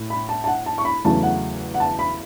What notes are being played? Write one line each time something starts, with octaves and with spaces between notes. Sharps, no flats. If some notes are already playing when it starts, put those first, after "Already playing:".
Already playing: A2 A3
B5
A5
A5
F#5
A5
C#6
B5
E2 C#3 F#3 A3 A5
F#5
F#5
A5
B5